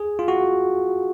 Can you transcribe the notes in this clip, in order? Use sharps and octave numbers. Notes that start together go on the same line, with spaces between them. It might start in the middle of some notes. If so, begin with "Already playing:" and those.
Already playing: G#4
F4
F#4